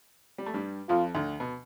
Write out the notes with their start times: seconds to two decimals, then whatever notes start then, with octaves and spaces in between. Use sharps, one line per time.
0.38 G3
0.46 A3
0.54 G2 G3
0.89 F2 F3 F4
1.15 D2 D3
1.40 B2